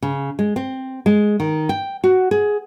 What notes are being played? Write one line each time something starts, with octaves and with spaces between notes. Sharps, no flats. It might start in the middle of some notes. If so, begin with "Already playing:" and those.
C#3
G#3
C4
G#3
D#3
G5
F#4
G#4